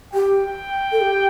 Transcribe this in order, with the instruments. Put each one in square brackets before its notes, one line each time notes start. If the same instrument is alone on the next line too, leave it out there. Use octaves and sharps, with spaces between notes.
[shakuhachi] G4 [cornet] G5
[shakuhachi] A4
G4